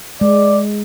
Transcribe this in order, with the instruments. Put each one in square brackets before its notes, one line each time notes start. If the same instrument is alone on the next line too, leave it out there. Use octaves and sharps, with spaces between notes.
[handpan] G#3 [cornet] D5